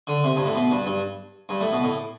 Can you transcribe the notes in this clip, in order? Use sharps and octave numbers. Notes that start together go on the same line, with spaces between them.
D3
C3
G2
A2
B2
G2
G2
G2
A2
B2
A2